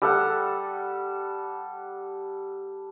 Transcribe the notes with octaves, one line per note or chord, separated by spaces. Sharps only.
G3 A4 F#5